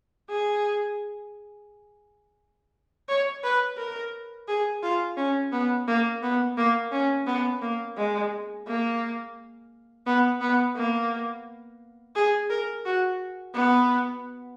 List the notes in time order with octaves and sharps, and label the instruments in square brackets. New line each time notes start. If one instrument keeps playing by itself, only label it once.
[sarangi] G#4
C#5
B4
A#4
G#4
F4
C#4
B3
A#3
B3
A#3
C#4
B3
A#3
G#3
A#3
B3
B3
A#3
G#4
A#4
F#4
B3